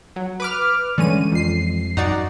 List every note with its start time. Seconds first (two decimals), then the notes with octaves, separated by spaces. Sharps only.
0.16 F#3
0.40 B4 D6 F6
0.98 D3 E3 G3 G#3 C#4 D#7
1.32 F2 C7
1.97 F#2 D#4 F#4 D5